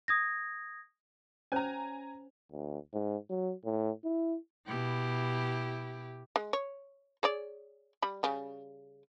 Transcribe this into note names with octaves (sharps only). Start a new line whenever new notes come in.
D#6 G#6 A#6
C#4 C5 C#5 G#5 A#5
D2
G#2
F#3
A2
E4
B2 E4 G4
G#3
C#5
G#4 C#5 D5
G3 B5
C#3 G3